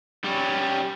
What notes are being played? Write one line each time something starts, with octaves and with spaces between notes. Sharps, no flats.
G3 C#4